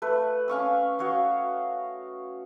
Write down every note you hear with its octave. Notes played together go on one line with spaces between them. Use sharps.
A3 B4
C#4 F5 C#6 E6
F#4 C#5 D#5 F5